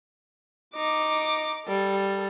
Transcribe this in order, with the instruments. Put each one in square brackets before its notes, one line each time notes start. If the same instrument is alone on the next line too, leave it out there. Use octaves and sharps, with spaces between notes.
[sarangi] D#4 [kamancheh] D6
[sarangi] G3 [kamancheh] A4